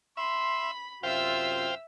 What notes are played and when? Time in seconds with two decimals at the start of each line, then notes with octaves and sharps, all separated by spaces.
0.17 E5 B5 C6
1.03 F#2 C3 F4 C5 E5 F5 G5 E6